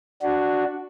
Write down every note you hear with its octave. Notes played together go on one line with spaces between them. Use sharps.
D4 F#4